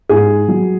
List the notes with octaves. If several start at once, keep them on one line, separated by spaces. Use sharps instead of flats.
G#2 G#4
F#3